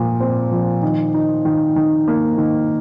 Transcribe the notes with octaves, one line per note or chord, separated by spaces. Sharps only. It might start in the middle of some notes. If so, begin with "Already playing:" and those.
Already playing: A#2 F3
C4
F3
D#3
D#4
D#3
D#3
A#3
D#3